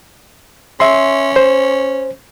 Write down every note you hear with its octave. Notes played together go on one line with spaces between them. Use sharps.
C#4 E5 C6
C5